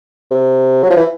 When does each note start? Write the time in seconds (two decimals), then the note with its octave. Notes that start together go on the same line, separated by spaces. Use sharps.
0.31 C3
0.83 F#3
0.90 F3
0.97 E3